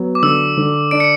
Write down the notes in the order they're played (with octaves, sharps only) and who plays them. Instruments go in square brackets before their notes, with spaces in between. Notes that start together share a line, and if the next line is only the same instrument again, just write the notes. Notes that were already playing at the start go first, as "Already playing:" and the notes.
Already playing: [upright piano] F#3 B3
[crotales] D6
[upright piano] D3 [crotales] E6
[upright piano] D3
[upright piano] D4 [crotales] D7
[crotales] C#7